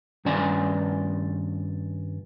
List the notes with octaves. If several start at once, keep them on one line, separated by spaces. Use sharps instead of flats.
G2 D#3 C#4 D5 G#5 C6